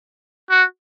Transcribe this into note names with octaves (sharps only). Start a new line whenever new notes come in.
F#4